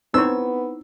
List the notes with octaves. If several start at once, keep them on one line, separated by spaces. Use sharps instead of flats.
B3 C4 D#4 E4 C5 C#5 E6